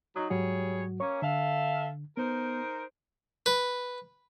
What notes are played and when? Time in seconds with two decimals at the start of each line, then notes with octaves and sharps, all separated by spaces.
0.16 F#3 D#4 D#6
0.30 G#2 F#3 G3 F#4 G#4 C#5
1.00 A#3 C#4 C#5 C#6
1.22 D3 A4 E5 F5
2.17 B3 D#4 A#4 C5
3.46 B4